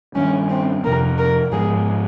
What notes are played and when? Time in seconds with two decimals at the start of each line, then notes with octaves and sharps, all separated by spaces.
0.15 G2 D#3 G3 C#4
0.50 C4
0.84 F2 C3 F3 C4 A#4
1.18 A#4
1.52 G#2 F3 G#3 G#4